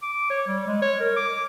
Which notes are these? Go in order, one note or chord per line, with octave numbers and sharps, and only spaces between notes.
D6
C#5
G3
G#3
C#5
A#4
D6